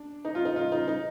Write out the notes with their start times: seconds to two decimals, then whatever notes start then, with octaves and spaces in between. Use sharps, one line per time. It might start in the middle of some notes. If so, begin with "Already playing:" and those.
Already playing: D4
0.25 D#4
0.35 F4
0.45 D#4
0.56 F4
0.72 D#4
0.88 D#4